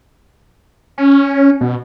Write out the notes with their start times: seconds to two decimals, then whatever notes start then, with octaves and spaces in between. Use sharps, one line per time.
0.98 C#4
1.61 B2